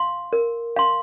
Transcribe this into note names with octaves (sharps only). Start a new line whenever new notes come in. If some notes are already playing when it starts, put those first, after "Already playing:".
Already playing: F5 C6
A#4
F5 C6